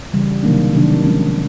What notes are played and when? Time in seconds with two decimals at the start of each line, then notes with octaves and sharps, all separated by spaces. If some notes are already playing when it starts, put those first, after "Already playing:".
0.13 C#3 E3 G3
0.43 C3 D#3 F#3 A#3 D4
0.73 C3 D#3 F#3 A#3 D4
1.04 F3 G#3 C#4